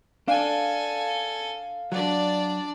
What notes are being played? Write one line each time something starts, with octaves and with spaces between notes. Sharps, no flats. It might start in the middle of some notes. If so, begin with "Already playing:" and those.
D4 A4 F5 G#5
F#3 D4 D5